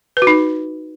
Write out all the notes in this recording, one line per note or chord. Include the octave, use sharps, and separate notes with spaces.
B4
F#4
D#4